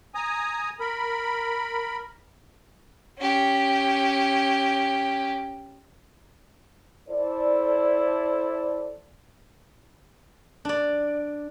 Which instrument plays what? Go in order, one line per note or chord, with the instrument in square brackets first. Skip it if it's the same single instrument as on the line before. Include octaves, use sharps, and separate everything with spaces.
[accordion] G#5 A#5 D#6
A#4 B5
[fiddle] C#4 G4
[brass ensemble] E4 A4 C5 D5
[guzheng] D4 D5